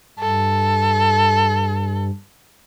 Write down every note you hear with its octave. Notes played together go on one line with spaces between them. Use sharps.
G2 A4